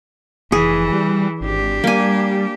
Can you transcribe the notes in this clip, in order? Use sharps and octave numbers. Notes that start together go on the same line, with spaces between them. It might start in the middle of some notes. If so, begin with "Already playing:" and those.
F1 E3 G#4
G3
G#1 D4 G4
G3 A#3 G#5